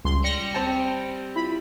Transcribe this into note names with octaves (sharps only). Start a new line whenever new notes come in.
C#2 G3 C6
G3 D5 A#6 C#7
C4 G5 A5
E4 F4 B5